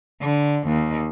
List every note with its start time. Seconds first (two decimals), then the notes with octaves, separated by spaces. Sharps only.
0.21 D3
0.68 D#2